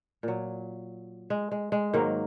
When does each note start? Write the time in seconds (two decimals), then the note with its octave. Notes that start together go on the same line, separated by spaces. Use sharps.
0.23 A#2 F#3
1.30 G#3
1.51 G#3
1.72 G#3
1.93 G#2 D#3 F#3 A#3